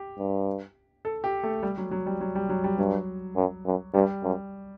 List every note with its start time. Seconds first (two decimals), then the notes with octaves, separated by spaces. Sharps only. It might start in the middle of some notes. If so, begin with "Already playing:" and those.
Already playing: G4
0.18 G2
1.05 A4
1.24 G4
1.43 A3
1.63 G3
1.78 F#3
1.91 F#3
2.06 G3
2.21 F#3
2.35 G3
2.49 F#3
2.64 G3
2.78 G2 F#3
3.36 F#2
3.66 F#2
3.94 G2 G3
4.23 F#2